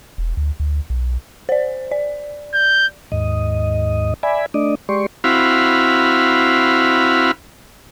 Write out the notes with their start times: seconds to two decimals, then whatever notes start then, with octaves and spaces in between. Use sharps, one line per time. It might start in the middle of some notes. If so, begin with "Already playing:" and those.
0.18 E1
0.37 D2
0.60 D2
0.90 B1
1.49 C5 D5
1.91 D5
2.54 G6
3.12 D#2 G#2 D#5
4.23 D5 E5 G#5 B5
4.54 A3 D4 D5 D#5
4.89 G#3 G4 D5 C6 C#6
5.24 C4 E4 F#4 F5 B5